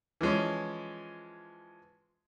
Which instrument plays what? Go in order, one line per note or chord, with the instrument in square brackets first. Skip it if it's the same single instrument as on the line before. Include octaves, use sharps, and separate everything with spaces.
[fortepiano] E3 F3 G#3 C#4